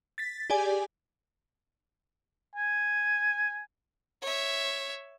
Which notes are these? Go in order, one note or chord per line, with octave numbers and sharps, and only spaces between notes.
A6 B6
G4 G#4 D5 G#5
G#5
C#5 E5